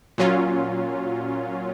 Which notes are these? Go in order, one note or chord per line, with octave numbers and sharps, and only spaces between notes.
A#2 F#3 C#4 F4